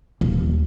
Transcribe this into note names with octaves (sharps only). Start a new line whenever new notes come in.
D#1